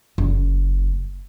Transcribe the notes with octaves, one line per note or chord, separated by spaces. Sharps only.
F#1